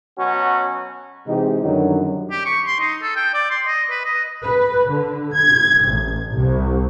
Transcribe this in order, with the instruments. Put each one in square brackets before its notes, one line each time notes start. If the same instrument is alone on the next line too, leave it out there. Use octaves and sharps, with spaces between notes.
[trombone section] B2 F#3 C#4 F#4
C3 E3 G#3 D#4 G4
F#2 D3 D#3 F#3 G3
[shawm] G4
C#6
C6
D#4
A4
G5
D5
C6
D#5
B4
D#5
[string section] B4
D3
G#6
A1
C2